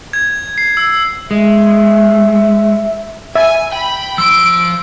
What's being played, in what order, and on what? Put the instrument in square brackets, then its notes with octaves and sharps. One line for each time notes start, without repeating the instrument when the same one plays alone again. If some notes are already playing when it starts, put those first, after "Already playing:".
[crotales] G#6
C7
E6
[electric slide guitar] G#3 [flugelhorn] E5
[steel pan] E5 [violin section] G#5
[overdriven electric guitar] G5 [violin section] B5
[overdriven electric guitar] F3 C6 [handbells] E6 [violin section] D7